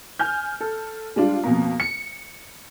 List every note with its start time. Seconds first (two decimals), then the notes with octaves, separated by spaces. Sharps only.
0.19 G#5 F6 G6
0.61 A4
1.16 G3 G#3 D4 F4
1.44 F2 B2 A#3
1.80 C#7